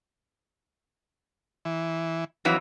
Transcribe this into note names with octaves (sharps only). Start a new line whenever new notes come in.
E3
F2 E3 F#3